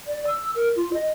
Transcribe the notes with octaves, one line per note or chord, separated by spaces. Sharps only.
D5
E6
A#4
F4
D#5